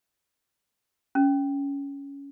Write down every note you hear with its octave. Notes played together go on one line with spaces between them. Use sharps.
C#4